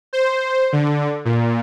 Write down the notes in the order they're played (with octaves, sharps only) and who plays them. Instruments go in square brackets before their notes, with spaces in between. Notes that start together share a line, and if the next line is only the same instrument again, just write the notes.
[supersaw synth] C5
D3
A#2